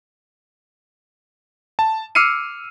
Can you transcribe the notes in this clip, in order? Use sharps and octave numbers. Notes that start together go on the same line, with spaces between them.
A5
D6 E6 F6 C7 C#7 D#7